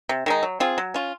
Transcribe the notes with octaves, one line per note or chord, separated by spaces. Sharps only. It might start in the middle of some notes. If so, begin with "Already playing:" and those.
C3
D#3 G#3 D#4
F#3
C4 F4 G#4
F#3
C#4 F4